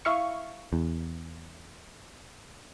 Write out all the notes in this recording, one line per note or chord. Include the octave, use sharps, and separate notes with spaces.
E4 F5 C#6
E2